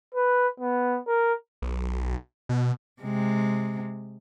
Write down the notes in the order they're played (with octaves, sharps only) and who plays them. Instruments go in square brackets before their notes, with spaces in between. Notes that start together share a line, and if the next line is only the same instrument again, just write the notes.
[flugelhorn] B4
B3
A#4
[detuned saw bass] B1
B2
[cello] C3 G#3